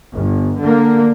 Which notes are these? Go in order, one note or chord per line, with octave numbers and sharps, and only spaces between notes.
G1
D3 A#3